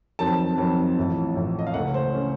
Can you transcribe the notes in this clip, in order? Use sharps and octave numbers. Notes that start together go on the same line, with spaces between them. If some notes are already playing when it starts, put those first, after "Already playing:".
F2 D#3 F#3 C4 A5
F2 D#3 F#3 C4
A1 A2 F3
A1 A2 F3
D#5
F5
C#2 C#3 A3 C#4 F#5
C5
C#3 A3 C#4